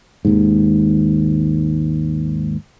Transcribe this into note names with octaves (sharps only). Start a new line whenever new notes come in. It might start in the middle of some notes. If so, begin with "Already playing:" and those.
G#1 D#2 G#2